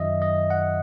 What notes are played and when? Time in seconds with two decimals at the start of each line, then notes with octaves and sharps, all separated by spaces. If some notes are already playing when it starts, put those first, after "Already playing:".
Already playing: F#2 D#3 F#3 D#5 E5
0.22 D#5
0.50 F#5